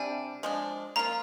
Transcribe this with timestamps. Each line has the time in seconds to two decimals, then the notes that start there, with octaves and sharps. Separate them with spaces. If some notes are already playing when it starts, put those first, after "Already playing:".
Already playing: C3 G3 D4 G#5
0.43 F3 G#3 D4
0.96 F3 A#3 F4 A#5